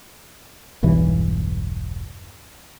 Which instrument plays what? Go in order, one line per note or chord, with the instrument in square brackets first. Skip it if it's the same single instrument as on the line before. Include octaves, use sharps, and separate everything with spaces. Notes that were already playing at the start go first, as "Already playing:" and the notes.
[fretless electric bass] E1 B1 G2 E3